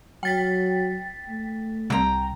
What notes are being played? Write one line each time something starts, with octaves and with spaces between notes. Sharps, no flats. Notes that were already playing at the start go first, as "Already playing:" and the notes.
F#3 G5 A6 B6
A3
C2 G5 A#5